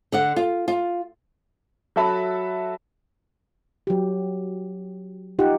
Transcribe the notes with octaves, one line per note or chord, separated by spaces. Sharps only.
D3 D5 F#5
F4
F4
F#3 F#4 A4 E5 A5 B5
F#3 G4
D#4 F4 G4 F#5